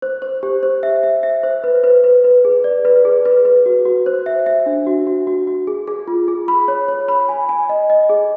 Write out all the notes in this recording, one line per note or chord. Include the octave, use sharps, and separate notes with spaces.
C5
C5
G4
C5
E5
E5
E5
C5
B4
B4
B4
B4
G#4
D5
B4
G#4
B4
B4
F#4
F#4
C5
E5
E5
D4
F#4
F#4
F#4
F#4
G#4
G#4
F4
G#4
B5
C#5
C#5
B5
G#5
G#5
D#5
D#5
G#4